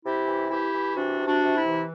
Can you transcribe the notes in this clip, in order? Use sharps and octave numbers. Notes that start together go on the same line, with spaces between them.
C3 E4 G4
E3
E3 E4 G4
E3
C3 D4 F#4
C3
D4 F#4
C3
E4
E3